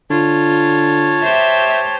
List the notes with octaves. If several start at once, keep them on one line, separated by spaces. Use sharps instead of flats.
D3 F4 C#5 A5
G4 C5 E5